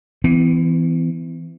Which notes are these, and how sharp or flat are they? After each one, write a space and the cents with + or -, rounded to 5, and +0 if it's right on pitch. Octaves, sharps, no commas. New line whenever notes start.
E3 +0 B3 +45